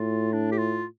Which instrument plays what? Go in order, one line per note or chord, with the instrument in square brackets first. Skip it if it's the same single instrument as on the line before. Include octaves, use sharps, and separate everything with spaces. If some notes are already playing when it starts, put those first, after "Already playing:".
Already playing: [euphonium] A2 [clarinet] F4
[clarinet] D4
G4
F4